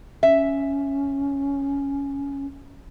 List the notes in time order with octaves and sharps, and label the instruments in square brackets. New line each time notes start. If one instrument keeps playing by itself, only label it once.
[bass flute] C#4 [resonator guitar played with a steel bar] E5